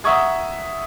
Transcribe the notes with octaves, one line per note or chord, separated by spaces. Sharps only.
E5 F#5 A#5 C#6 D#6 G#6